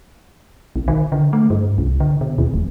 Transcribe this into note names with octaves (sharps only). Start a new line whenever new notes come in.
B1
D#3
D3
A3
G2
C2
D3
B2
D#2
E1